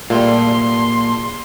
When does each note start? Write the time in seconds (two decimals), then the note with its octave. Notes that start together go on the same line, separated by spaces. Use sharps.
0.10 A#2 G3 A3 A#3 G#4 F5 C6